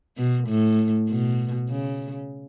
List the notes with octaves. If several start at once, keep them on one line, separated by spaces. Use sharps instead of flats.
B2
A2
B2
C#3